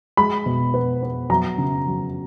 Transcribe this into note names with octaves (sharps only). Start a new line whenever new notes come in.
G#3 B5
B2
B3
B3
F#3 A#5
C#3
F#3